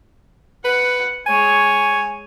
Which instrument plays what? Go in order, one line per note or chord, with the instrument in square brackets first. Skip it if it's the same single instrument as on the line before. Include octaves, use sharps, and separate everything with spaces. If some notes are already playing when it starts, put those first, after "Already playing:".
[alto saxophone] B4 [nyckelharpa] F#5
[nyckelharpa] G#3 C#5 [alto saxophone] G#5